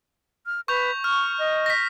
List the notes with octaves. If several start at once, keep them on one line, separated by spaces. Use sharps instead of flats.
F6
B4 C#6 G6 F7
C#6 F6
D#5
A#6 B6